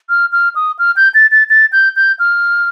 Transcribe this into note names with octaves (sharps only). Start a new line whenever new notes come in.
F6
F6
D#6
F6
G6
A6
A6
A6
G6
G6
F6